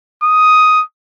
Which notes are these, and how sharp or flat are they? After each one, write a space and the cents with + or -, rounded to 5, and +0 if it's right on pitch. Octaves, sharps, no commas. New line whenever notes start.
D#6 +5